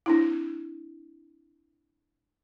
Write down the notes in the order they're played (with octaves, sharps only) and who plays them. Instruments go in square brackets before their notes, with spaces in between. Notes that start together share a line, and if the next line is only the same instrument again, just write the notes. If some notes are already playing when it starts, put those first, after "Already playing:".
[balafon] C4 D4 E4